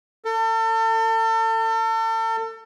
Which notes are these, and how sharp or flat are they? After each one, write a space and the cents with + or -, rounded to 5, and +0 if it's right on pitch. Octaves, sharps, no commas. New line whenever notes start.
A4 +35